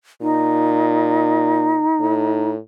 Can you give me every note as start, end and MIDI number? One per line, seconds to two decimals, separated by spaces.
0.21 1.88 46
0.21 2.51 63
1.99 2.58 45